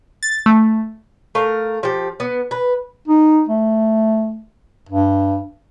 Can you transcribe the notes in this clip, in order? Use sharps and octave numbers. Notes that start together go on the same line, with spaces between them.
A6
A3
A3 A#4 F5
F3 G4
B3
B4
D#4
A3
G2